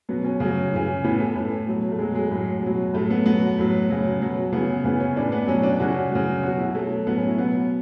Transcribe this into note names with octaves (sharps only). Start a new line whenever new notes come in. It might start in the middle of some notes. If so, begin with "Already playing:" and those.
B2 F#3 B3
C#4
C#3
F#3
C#3 E3
A2 E3 B3
A3
A2 E3
B2 F#3
A3
B2 F#3 G#3
G#3
A2 F#3
B2 F#3
A2 F#3 A3
B3
B2 F#3 B3
A2 F#3
C#3 F#3
B2 F#3
C#3 E3 B3
C#3 E3 B3
C#4
A2 E3 D4
B3
B2 F#3 C#4
D4
C#3 E3 F#4
C#3 F#3
B2 F#3 F#4
E4
B2 F#3 A3
A2 F#3 B3
C#4
E4
B2 F#3 B3